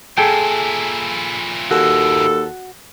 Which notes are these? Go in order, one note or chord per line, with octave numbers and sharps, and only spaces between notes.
A#2 E4 G#4 A4 G5
D#2 F#4 A4